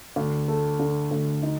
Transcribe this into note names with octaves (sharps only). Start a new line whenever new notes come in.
D2
A3
D3
D2
D#4